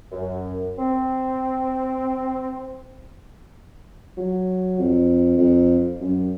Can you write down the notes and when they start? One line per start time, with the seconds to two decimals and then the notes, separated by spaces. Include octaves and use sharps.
0.12 F#2
0.78 C4
4.17 F#3
4.79 F2
5.38 F2
6.00 F#2